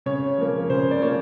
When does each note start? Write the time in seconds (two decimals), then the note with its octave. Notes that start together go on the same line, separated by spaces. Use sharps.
0.06 C#3 C#5
0.38 F3 A#3
0.70 C#3 C5
0.91 D5
1.02 F3 A#3 C#5